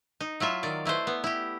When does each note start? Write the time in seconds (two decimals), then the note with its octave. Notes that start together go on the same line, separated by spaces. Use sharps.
0.21 D#4
0.40 F#3 E4 F4 E5
0.63 D#3 D5
0.85 A3 E4 B4 C5
1.07 B3
1.24 E4 G4